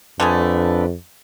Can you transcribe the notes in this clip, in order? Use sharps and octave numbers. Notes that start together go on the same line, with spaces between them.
F2 D3 A3 D4 G#4 B4